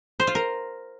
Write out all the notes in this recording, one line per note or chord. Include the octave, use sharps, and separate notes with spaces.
C5
F4
A#4